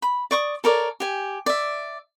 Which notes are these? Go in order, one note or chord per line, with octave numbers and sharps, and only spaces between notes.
B5
D5 C#6 D#6
A4 A#4 C#5 D5
G4 G#5
D5 E5